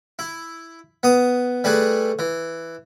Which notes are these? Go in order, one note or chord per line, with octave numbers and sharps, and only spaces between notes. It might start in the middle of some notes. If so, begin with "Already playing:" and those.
E4
B3 D#6
G3 A3 G#4 B4
E3